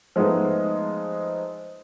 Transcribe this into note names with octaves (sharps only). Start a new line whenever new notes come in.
F3 G#3 A3 B3 D#4